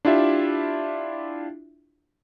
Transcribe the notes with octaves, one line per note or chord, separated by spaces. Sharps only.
D4 E4 F4 G4 E5